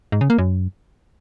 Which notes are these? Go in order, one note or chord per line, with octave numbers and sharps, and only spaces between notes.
G#2
C#3
A#3
F#2